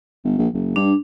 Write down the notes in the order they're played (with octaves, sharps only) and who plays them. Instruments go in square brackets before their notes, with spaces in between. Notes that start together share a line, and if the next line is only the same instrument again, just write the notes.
[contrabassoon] G1
A#1
F#1
[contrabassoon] G2 [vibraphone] D4